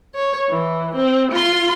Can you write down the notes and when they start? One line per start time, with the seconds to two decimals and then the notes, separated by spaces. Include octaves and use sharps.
0.15 C#5
0.50 E3
0.96 C4
1.32 F4 C6